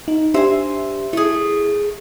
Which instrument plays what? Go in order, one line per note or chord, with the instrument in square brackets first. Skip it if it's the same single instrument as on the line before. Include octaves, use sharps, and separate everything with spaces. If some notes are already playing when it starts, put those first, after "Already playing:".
[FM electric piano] D#4
[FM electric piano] D4 G4 E5 [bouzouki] C5 G#5
[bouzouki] A3 G#4 [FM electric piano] E4